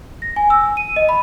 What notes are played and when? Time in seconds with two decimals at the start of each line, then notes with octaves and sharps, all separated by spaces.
0.22 A#6
0.36 G#5
0.50 E6
0.77 D#7
0.96 D#5
1.09 B5